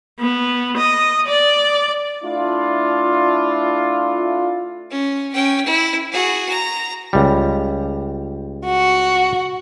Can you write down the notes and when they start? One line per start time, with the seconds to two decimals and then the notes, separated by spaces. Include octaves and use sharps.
0.20 B3
0.77 D#5
1.28 D5
2.24 A3 D4 E4 F4
4.91 C#4
5.33 C#4 G5
5.65 E4
6.12 F#4 G#4
6.49 A#5
7.13 C#2 G3
8.65 F#4